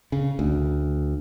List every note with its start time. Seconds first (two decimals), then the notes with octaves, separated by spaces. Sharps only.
0.12 C#3
0.39 D2